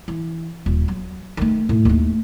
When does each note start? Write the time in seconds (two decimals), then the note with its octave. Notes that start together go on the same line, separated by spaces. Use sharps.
0.08 E3
0.66 D#1
0.88 F#3
1.37 D#3 A3
1.69 A2
1.85 D#2 A3